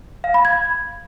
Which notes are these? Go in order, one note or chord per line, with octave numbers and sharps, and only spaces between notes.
F5
B5
G#6